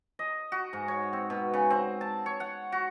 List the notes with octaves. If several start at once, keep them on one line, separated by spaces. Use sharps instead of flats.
D#5
F#4
G#2
C#5
C4
B2
C#3
C4
A5
C#5
F#5
F#4